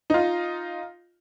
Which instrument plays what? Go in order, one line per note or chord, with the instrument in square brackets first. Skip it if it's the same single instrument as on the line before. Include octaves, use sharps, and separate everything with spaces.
[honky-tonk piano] D#4 F4